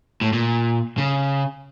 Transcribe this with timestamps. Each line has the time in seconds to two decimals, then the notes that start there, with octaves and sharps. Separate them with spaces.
0.21 A2
0.33 A#2
0.98 C#3